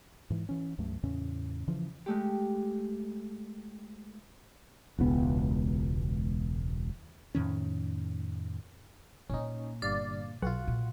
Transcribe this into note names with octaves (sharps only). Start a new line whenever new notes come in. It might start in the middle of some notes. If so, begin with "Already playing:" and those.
G#2 E3
E3 C#4
C#2 G2 F#3 A3
E2 A2 C#3 C#4
C#3 E3 F3
G#3 A3 G4
E1 C#2 B3
F2 A2 D#3 C#4
A#2 A#3 C#4 D#4
G1 G2 D5 F5
B1 F4 F#4 F#5
A#2